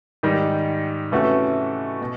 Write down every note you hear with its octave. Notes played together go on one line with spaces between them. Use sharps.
G#2 D#3 G3
C3 E3 A3 C#4 F#4
B2